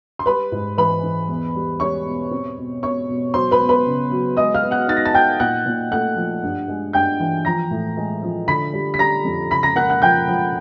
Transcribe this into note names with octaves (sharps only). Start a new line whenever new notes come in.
C6
G3 B4 B5
G#2
E3 B4 B5
E3
E2
G3
G3 C#5 C#6
B2
C4
B2
B2 C#5 C#6
B2
F#3 C5 C6
B4 B5
B3
B4 B5
C#3
F#3
G#3 D#5 D#6
F5 F6
B3
F#5 F#6
D#4 A6
A#6
A5 A6
D#4 G5 G6
A#2 F#5 F#6
A#2
A3 F#5 F#6
F3
G2
G#3
G2 G5 G6
E3
F3 A#5 A#6
A2
G#3
F3
D3 B5 B6
G3
B6
G3 A#5 A#6
F2
C#3 B5 B6
A#5 A#6
A#3 F#5 F#6
F#5 F#6
F3 G5 G6
F3